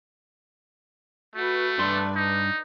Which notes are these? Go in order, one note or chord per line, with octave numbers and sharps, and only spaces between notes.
A3 F#4 B4
G2 D4 B4 D5 C6
D#4